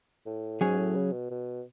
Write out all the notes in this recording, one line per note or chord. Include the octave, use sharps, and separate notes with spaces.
A2
G#2 F#3 C#4 G#4
A2
C#3
B2
B2